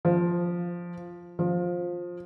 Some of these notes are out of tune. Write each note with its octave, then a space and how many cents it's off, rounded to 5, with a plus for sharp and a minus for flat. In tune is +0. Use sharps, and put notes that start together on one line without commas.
F3 +0
F3 +15